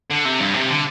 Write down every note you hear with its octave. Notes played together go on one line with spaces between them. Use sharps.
D3
C3
G2
C3
D3